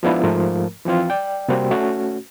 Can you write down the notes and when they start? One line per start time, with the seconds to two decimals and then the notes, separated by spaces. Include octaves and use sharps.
0.03 F3 G#3 B3 D4 E4 F4
0.23 G#2 F3 A3 A#4
0.85 E3 F3 C4 F4
1.10 D5 G5
1.48 C3 G3 A#3 C4 F#4 G4
1.71 A3 C#4 F#4